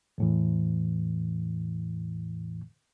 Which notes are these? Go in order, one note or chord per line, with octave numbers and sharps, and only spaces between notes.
E2 A2 E3